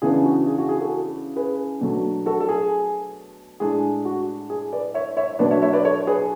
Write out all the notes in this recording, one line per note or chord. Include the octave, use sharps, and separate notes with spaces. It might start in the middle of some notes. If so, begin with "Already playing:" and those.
C#3 E3 B3 D4 G#4
F#4
G#4
F#4
G#4
F#4 A4
G#4 B4
B2 F#3 A3 D4
F#4 A4
A4
G#4
A2 G#3 D4 G#4
F#4
G#4
B4 D5
C#5 E5
C#5 E5
B2 F#3 B3 D4 B4 D5
C#5 E5
C#5 E5
B4 D5
A4 C#5
G#4 B4